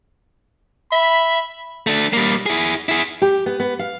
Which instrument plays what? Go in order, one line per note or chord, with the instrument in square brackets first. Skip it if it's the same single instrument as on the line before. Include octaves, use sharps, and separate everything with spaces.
[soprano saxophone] E5 [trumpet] B5
[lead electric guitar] A3 D4
G3 A#3
E4 G#4
E4 G#4
[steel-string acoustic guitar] G4
B3
B3
F5